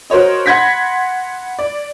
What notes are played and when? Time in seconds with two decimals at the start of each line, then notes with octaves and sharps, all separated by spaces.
0.10 F#4 A#4 C5 C#5 D#5
0.46 F#5 B5 C6 G#6 A#6 B6
1.59 D5